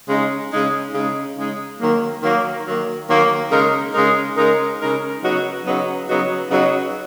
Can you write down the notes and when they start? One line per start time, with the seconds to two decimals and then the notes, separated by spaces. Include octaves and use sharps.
0.09 C#3 G#3 D#4
0.52 C#3 G#3 D#4
0.94 C#3 G#3 D#4
1.37 C#3 G#3 D#4
1.80 D#3 F#3 A#3
2.23 D#3 F#3 A#3
2.66 D#3 F#3 A#3
3.08 D#3 F#3 A#3
3.51 C#3 G#3 D#4 A#4
3.94 C#3 G#3 D#4 A#4
4.36 C#3 G#3 D#4 A#4
4.79 C#3 G#3 D#4 A#4
5.22 C#3 F#3 B3 D#4 F#4
5.65 C#3 F#3 B3 D#4 F#4
6.08 C#3 F#3 B3 D#4 F#4
6.51 C#3 F#3 B3 D#4 F#4